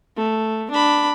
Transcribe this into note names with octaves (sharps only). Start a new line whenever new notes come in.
A3
D4 B5